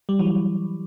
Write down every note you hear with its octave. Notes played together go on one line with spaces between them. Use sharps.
G3
E3 F#3